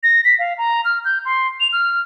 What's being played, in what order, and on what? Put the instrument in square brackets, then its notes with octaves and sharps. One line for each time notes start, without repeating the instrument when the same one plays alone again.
[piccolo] A#6
B6
F5
A#5
F6
G6
C6
F7
F6